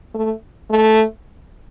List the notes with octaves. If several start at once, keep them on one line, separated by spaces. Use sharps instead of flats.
A3
A3